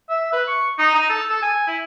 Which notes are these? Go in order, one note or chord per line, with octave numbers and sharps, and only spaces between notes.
E5
B4
C#6
D#4
D#4
A4
A4
G#5
E4